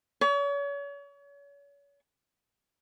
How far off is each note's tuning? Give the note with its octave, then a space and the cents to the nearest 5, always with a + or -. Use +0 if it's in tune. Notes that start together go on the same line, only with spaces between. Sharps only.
C#5 +35